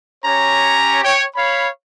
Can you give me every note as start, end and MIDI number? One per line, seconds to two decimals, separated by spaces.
0.25 1.04 61
0.25 1.04 67
0.25 1.04 73
0.25 1.04 82
1.04 1.23 73
1.04 1.23 79
1.36 1.67 73
1.36 1.67 77
1.36 1.67 83